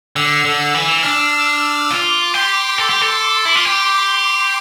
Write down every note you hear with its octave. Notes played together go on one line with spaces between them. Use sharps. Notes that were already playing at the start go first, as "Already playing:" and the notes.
D3 E6
D3
E6
E3
D4 F6
F4 D6
G4 C6
A4
G4
A4
E4
F4
G4